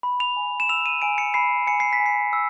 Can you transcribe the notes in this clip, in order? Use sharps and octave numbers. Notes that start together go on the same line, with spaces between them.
B5
F7
G#5
E7
E6 F7
D#7
G#5 D7
C#7
B5 C7
G#5 C#7
C7
B6
G#5
C7
E6